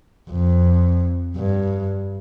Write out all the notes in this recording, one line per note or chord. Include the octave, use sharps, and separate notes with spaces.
F2
G2